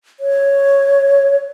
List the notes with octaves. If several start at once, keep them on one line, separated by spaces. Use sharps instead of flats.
C#5